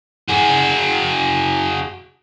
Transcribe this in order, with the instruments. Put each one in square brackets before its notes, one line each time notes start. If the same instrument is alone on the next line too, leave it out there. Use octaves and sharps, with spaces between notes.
[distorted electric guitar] F#4 G#4